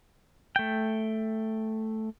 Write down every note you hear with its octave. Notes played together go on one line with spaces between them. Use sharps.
A3 G5